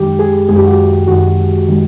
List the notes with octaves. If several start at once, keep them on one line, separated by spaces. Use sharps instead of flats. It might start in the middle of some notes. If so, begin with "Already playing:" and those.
Already playing: F#2 D#3 G#3 G4
G#4
F#2 D#3 G#3 G#4
G4
F#4
G4
F#2 D#3 G#3 F#4
D#3 G#3